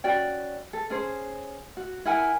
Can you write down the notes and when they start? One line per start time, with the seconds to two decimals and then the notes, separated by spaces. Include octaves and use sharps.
0.04 C#4 F#4 D5 G5
0.73 A4
0.90 C#4 G#4 C5
1.77 F#4
2.05 E4 A#4 F#5 G#5